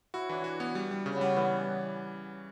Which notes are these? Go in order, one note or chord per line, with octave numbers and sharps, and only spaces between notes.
E4 F#4
E3 D4
F#4
B3
G3
G3
C#3 C#4
B3
G3 C#4
E3 B3